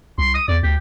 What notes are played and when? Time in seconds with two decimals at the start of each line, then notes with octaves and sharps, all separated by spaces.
0.18 C2 C6
0.34 D#6
0.48 E2 D5
0.63 D2 G4